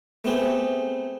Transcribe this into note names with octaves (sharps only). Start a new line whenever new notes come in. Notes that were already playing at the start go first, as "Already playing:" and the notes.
A3 B3 C4 G4 G#4